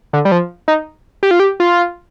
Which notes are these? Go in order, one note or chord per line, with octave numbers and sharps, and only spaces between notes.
D3
G3
F3
D#4
G4
F4
G4
F4